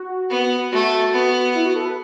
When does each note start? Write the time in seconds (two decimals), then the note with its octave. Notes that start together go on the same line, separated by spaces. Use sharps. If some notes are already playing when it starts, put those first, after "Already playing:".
Already playing: F#4
0.30 B3
0.71 A3 F#4
1.13 B3
1.54 E4
1.65 F#4
1.76 A4
1.86 B4